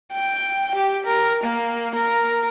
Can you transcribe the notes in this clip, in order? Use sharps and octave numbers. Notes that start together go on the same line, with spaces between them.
G5
G4
A#4
A#3
A#4